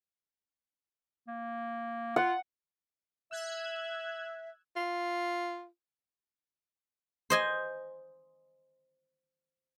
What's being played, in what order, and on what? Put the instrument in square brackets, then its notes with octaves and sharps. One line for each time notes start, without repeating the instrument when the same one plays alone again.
[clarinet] A#3
[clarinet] F4 [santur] F#5
[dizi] E5 [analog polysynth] E6 F#6 G#6
[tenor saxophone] F4
[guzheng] C5 D#5 G#5